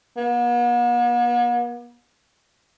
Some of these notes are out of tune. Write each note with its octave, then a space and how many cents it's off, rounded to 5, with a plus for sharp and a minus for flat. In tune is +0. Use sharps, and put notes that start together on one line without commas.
B3 -45